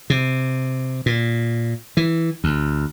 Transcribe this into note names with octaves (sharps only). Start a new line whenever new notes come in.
C3
A#2
E3
D2